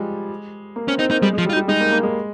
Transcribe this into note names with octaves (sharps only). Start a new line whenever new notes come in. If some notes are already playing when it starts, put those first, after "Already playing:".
Already playing: F3 G3 G#3
A#3
C4 C#4
C4 D#4
A#3 D#4
G3 G#3
G#3
F3
G3
F4
D#4
G3
G#3 D#4
A#3
A#3
G#3